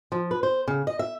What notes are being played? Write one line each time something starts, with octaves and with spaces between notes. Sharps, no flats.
F3
B4
C5
C#3
D#5
E5